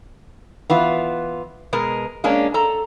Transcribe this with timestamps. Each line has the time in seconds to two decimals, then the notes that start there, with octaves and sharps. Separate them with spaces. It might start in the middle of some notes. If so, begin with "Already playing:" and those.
0.70 E3 B3 F4
1.73 B2 G#3 A#4
2.24 G#3 A#3 C#4 D4
2.54 A4 A#5